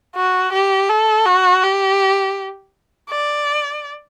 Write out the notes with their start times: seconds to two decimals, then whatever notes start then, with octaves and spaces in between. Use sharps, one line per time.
0.16 F#4
0.53 G4
0.89 A4
1.26 F#4
1.63 G4
3.10 D5